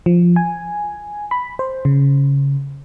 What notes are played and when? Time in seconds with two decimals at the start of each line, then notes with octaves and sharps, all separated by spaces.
0.06 F3
0.36 G#5
1.31 B5
1.59 C5
1.85 C#3